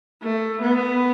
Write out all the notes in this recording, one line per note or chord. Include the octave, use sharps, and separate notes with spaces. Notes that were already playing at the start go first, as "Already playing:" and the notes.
A3
B3